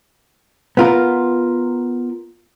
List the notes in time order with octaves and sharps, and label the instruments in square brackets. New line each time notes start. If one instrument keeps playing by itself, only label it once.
[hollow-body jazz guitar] B3 F4 A#4